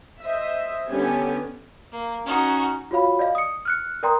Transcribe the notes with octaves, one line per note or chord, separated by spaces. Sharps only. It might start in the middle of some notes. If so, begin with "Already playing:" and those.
C5 D#5 E5
D3 G3 B3 C#4 G4 G#5
A#3
C#4 D#4 F#4
F4 F#4 C#5 F5 B5
D5 D#5 F5
D#6 C#7
F6 F#6 C#7
A#4 D5 G5 A#5 C6 D#6